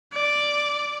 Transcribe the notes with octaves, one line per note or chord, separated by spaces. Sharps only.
D5